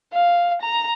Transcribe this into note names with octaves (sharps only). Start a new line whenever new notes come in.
F5
A#5